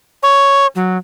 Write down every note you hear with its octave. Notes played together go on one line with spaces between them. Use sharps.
C#5
F#3